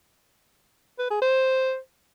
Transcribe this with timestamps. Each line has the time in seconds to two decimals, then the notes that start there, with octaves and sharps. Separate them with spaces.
0.99 B4
1.10 G#4
1.22 C5